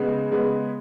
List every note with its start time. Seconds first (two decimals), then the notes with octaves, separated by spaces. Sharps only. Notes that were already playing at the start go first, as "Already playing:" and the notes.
Already playing: C#3 G#3 B3
0.31 C#3 G#3 B3